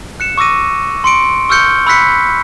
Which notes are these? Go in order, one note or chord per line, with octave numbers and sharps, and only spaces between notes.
F#6 C#7 E7
C#6 D6 E6 A#6 D#7
C6 C#7 D7
C#6 E6 F6 G6 C#7 G7
B5 E6 F#6 B6 C#7